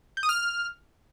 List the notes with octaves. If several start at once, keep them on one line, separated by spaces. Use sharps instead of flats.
G6
D#6
F6